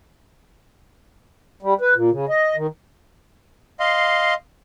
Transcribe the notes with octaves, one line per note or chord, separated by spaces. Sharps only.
G3
B4
A#2
C#3
D#5
D#3
D#5 F5 C6